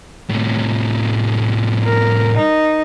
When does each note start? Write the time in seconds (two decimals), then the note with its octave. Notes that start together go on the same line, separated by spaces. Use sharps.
0.30 A2 C3
1.84 A#4
2.36 D#4